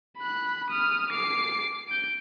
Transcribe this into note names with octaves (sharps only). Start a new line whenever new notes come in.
B5 F#6
D#6 F6
D6 C7
G6 D7